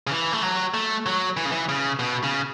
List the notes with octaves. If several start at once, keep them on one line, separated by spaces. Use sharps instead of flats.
C#3
E3
A3
F#3
A3
F#3
E3
C#3
E3
C#3
B2
C#3